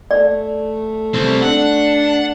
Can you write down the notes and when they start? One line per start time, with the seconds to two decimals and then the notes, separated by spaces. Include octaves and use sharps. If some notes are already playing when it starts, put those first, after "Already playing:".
0.11 A3 D5
1.14 G3 C4
1.42 D4 F#5